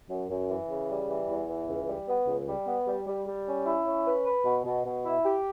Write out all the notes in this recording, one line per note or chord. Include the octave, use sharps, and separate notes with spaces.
F#2
F#2
E3
C#3
G3
E3
E2
E3
C#2
G3
B3
C#2
G3
B3
G3
G3
G3
C#4
E4
C#4
B4
B4
B2
B2
B2
E4
G4